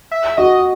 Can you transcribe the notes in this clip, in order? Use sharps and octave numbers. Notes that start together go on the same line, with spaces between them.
E5
F#4 D#5